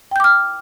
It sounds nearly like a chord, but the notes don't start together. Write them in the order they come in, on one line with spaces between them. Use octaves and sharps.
G5 G6 D6 F6